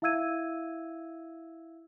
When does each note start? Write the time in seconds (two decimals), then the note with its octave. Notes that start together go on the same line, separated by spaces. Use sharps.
0.02 E4 E5 F5 E6 G#6 D#7